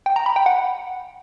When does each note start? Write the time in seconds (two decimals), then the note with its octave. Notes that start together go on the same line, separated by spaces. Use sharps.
0.06 G5
0.16 A#5
0.26 B5
0.36 G5
0.46 F#5